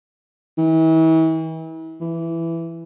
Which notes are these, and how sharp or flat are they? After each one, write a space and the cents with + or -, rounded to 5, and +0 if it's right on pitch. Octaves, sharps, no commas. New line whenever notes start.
E3 -40
E3 +10